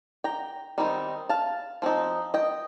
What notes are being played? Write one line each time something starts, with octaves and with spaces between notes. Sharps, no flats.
G5 A#5
D#3 G3 C4 D#4
F5 A5
F3 C4 D#4
D#5 G5